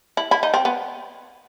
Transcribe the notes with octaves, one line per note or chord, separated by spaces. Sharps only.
E4
E4
D#4
C4
B3